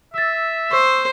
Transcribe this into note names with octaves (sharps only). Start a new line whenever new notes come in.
E5 E6 A6
C5 C#6 E6